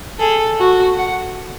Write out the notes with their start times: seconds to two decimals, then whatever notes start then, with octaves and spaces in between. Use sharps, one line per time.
0.19 G#4 A4
0.58 F#4
0.98 F#5